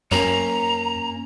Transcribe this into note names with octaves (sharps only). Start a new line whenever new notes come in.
F#2 A#3 C#4 A#5